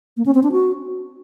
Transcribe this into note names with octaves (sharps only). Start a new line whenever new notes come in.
A#3
C#4
C4
D4
F#4